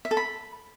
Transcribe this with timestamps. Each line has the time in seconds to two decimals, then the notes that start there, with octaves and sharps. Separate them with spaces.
0.05 E5
0.11 A4
0.17 B5